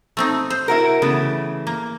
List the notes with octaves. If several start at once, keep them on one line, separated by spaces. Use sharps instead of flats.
A3 C4 D#4
C5
E4 F#4 A#4
C#3 E3 A3 B3
A#3